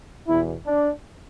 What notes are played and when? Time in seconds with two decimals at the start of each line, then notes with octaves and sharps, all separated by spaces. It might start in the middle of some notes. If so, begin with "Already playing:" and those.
0.27 E2 B2 E4
0.66 D4